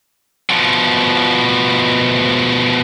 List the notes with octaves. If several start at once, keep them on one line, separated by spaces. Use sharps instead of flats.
B2 F3